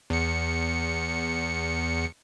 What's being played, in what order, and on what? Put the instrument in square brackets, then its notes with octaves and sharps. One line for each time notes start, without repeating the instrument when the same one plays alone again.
[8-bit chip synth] E2 C#7